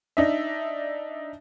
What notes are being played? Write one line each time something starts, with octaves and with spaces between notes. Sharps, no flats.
D4 D#4 E5